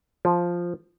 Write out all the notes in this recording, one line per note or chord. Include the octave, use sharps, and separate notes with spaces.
F3